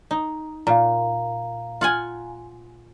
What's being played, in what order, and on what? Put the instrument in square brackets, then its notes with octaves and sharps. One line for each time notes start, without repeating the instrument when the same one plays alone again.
[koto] D#4
[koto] A#2 [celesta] F5 A#5
[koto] F4 F#5 G#5